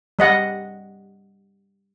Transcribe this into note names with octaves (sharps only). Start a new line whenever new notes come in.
G3 D#5 F#5